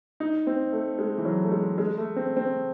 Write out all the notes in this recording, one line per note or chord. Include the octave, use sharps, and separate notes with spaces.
D#4
C4
A3
G#3
E3
F#3
A3
G#3
G#3
A3
C4
C4